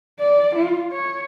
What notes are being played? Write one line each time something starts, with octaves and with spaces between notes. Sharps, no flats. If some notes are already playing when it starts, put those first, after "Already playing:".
D5
F4
C#5